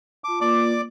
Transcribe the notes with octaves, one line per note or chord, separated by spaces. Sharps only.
F4 A5 D6
A#3 F4 B4 D5 D6